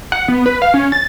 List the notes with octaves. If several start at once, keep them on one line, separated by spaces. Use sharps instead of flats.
F#5
B3
B4
F5
C#4
A6